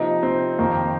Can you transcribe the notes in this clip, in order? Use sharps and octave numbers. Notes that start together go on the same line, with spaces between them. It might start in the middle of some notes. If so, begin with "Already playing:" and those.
Already playing: C3 F3 A#3 D#4
C4
F2 D#3 A#3